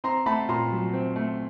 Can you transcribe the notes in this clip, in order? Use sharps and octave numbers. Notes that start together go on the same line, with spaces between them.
C4 A#5 C6
A3 A5 B5
A#2 A#5 C6
F#3
C4
A3